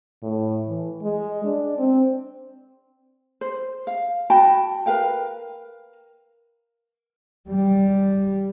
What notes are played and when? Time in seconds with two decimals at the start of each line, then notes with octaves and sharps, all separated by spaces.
0.23 A2
0.68 E3
1.02 G#3
1.44 D4
1.78 C4
3.41 C5
3.87 F5
4.30 F#4 G5 A5 B5
4.86 A#4 B4 F5 G5
7.48 G3